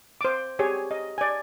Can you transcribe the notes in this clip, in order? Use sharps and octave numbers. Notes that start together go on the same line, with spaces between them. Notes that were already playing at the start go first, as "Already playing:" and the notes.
C5 D6
G4 G#4 C#5
D#5
D5 G#5